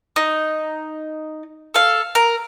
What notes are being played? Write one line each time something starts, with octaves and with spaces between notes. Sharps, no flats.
D#4
A4 F5
A#4